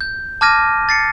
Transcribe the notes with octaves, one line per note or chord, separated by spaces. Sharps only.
G6
A5 D6 F6 G#6 A#6 D#7
A6 C7 C#7